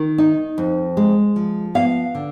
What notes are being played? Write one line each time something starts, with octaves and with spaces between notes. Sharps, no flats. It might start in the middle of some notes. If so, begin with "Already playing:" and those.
Already playing: D#3
D#4
F2
G#3
F3
B3 F5
D3